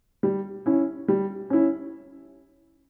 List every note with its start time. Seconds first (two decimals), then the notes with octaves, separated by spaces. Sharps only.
0.23 G3
0.66 C#4 E4
1.08 G3
1.50 C#4 E4